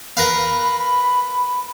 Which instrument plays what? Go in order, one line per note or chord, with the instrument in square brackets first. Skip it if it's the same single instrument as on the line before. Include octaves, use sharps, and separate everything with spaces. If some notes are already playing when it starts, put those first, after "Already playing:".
[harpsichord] A#4 B4 F5 [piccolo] B5